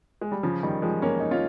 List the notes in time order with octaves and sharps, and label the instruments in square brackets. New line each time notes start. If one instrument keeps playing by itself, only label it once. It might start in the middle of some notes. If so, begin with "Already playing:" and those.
[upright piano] G#3
G3
C#3 F3
D#3 G3
F3 G#3
A#3 C#4
D#4
C#4 F4